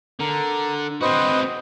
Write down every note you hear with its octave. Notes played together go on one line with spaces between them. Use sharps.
D3 A#4
C4 F#4 B4 C5 D#5